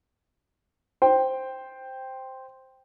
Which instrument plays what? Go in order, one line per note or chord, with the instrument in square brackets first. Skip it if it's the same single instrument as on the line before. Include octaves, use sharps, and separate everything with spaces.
[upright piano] C5 G5